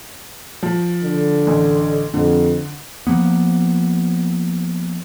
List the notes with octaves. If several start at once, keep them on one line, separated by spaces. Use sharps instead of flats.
F3
D3
A1
F2 D3
F3 A#3 B3